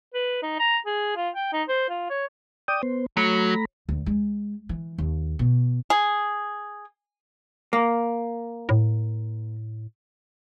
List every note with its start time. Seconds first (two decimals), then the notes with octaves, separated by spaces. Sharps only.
0.14 B4
0.43 D#4
0.59 A#5
0.86 G#4
1.17 F4
1.35 G5
1.53 D#4
1.69 C5
1.89 F4
2.10 C#5
2.68 D5 G5 D#6
2.83 B3 C5
3.17 F#3 A3 A#5 B5
3.89 D2
4.06 G#3
4.69 E3
4.98 D#2
5.39 B2
5.90 G#4
7.73 A#3
8.69 A2